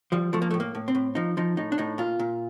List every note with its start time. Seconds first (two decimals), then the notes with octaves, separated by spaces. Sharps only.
0.12 F3 G3
0.33 F3 A3
0.42 A#3
0.51 A3
0.54 A2
0.60 A#3
0.75 A2
0.88 C4
0.95 A2
1.15 F3 D#4
1.37 F3 D#4
1.57 A2 D#4
1.72 D4
1.78 A2 D#4
1.98 A#2 F4
2.19 A#2